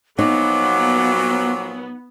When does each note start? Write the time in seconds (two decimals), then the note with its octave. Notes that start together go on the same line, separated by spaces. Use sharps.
0.19 A#2 F3 F#3 B3 D#4 D6